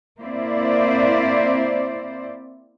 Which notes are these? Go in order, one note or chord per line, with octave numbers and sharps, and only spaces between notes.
A#3 C4 E4 C5 D5